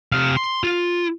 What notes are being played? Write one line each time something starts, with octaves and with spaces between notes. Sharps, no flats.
C3 F5
C6
F4